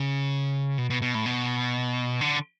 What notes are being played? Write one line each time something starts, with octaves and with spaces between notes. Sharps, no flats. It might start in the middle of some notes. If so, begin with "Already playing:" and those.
Already playing: C#3
B2
B2
B2
A2
B2
D3